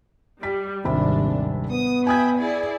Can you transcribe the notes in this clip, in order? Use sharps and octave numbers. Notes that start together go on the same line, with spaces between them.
G3 B6
D#1 G#1 C3 D4 B5
B3 D#6
E5 G5 G#5 B5 D#6 G#6
E4 G#4 D5